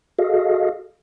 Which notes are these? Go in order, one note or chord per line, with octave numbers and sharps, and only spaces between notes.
F#4 G#4 A4 D#5 F5